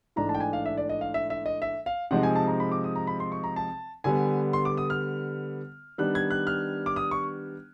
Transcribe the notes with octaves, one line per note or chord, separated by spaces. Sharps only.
G#2 E3 A3 D4 A#5
A5
G5
G#5
F5
E5
D5
D#5
F5
E5
E5
D#5
E5
F5
C3 F3 G#3 C4 D#4 F#5
G#5
A5
A#5
B5
D6
D#6
A#5
B5
C6
C#6
A#5
A5
D3 G3 B3 G#5
C6
D6
D#6
F6
D#3 G3 B3 D4 F#6
G#6
F#6
F6
D6
D#6
C#6